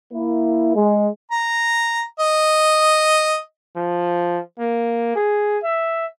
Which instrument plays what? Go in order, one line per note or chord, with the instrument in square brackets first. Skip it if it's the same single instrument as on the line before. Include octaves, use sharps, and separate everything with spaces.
[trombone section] A#3 E4
G#3
[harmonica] A#5
D#5
[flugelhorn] F3
A#3
G#4
E5